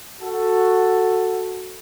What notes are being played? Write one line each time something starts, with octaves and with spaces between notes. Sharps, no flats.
F#4 A4